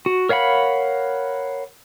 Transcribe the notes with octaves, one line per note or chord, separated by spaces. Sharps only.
F#4
A#4 C#5 F5 F#5 B5